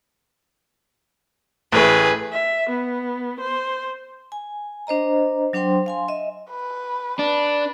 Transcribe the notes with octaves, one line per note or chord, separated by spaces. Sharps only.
A1 A3 G#4 B4
E5
B3
C5
G#5
D4 C5 D#5 A#5
F#3 D4 C5 G5 C6
F5 G#5 C6
D#5 E5
B4
D4 B4